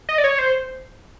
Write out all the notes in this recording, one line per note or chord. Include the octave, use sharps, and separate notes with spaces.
D#5
D5
C#5
C5